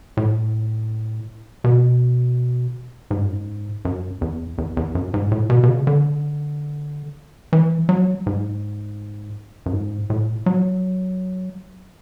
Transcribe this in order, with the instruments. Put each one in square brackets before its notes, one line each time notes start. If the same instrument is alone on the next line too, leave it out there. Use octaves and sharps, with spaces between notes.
[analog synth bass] A2
B2
G#2
F#2
G#2
F#2
E2
E2
E2
F#2
G#2
A2
B2
B2
C#3
D3
E3
F#3
G#2
F#2
G#2
A2
F#3